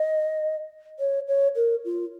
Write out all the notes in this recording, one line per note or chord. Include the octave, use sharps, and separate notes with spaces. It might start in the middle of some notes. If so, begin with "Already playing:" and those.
Already playing: D#5
C#5
C#5
A#4
F4